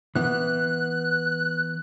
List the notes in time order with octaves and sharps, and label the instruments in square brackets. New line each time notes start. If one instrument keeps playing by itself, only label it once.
[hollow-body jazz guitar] E3 B3 [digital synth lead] F#6